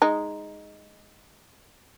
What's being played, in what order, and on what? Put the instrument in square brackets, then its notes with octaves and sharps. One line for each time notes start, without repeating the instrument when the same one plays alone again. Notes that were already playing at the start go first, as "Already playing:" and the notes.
[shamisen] G#3 D#4